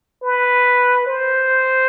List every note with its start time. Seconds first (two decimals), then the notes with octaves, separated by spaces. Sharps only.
0.23 B4
1.07 C5